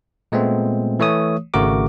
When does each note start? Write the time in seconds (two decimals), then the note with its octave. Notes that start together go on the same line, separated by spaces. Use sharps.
0.32 A#2 G#3 A3 B3 C4
1.00 E3 A3 C#5 D#6
1.54 G#1 C#3 A3 F#4 A#4 D6